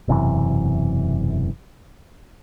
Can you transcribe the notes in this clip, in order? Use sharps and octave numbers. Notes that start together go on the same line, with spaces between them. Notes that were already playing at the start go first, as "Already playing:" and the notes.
E1 F#2 C3 E3